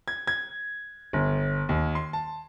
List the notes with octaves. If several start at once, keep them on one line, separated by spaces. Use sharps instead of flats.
G#6
G#6
G1
D#2
C6
A5